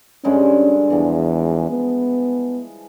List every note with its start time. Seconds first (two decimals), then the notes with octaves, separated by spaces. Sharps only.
0.24 G2 D3 G#3 C#4
0.90 E2 E3 F3
1.70 B3